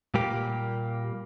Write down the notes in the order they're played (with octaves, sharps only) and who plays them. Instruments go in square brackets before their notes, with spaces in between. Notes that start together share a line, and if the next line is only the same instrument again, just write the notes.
[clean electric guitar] A#2 G3 A#3 G4